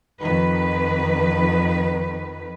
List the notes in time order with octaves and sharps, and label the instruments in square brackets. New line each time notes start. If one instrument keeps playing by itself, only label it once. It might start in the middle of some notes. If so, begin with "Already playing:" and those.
[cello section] F2 D#3 B4